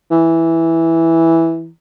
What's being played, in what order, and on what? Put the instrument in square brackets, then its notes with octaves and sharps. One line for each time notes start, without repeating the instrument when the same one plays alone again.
[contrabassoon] E3